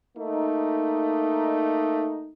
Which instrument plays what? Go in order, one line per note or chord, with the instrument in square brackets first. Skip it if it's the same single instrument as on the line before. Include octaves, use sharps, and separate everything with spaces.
[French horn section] A3 A#3 D#4